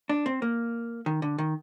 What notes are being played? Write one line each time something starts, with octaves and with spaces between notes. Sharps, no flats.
D4
C4
A#3
D#3
D3
D#3